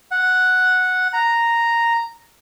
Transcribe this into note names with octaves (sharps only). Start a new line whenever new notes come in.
F#5
A#5